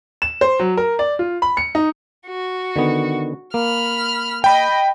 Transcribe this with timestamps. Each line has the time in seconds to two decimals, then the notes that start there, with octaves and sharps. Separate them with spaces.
0.22 E7
0.41 C5
0.59 F#3
0.77 A#4
0.99 D5
1.19 F4
1.42 B5
1.57 C#7
1.75 D#4
2.27 F#4
2.76 D3 D#3 B3
3.54 A#3 B5 F6
4.44 D#5 G5 B5